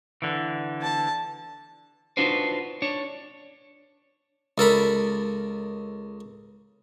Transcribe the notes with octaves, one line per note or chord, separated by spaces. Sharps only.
D3 E3
A5
D4 D#4 F4 F#4 B4 C5
D4 C#5
C#2 A4 A#4 B5